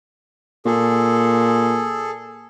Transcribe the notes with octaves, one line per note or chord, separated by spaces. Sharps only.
A#2 G#4 A4